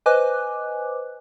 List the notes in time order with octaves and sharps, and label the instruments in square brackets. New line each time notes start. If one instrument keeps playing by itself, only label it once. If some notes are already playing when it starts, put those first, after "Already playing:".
[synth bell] B4 C5 D#5 G#5 D6 F#6